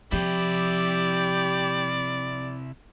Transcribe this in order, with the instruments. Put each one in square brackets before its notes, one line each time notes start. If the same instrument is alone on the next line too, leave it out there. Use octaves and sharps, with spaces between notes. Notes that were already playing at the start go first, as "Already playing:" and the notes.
[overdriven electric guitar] C3 E4 [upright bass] F3 [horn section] G4 [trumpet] D5